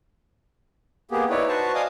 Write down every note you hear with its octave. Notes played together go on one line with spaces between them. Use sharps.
A#3 B3 G4 G#4
D#4 E4 B4 C#5 D5
F#4 B4 C5 A5 C#6
D5 D#5 F5 G#5 D6 D#6